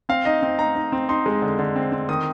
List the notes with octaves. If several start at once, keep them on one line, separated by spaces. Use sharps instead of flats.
C4 F5
D#4 D#5
C4
D#4 A#5
D#4
C4
D#4 C6
G#3
D3
D3
C4
C4
D#3 D#6